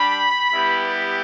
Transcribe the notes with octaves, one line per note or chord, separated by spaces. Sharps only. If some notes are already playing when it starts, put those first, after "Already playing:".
Already playing: G3 D4 G4 B5
G3 B3 E4 G4